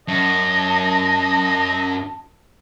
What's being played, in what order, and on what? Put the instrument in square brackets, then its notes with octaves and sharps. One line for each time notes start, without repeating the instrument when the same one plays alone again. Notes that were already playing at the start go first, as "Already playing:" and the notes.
[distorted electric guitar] F#2 [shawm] D#5 [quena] A5